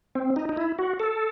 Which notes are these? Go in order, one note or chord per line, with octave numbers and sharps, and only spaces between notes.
C4
D#4
D#4
E4
F#4
A4